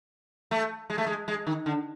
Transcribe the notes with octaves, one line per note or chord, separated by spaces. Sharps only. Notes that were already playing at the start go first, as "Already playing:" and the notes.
A3
G#3
A3
G#3
G#3
D#3
D3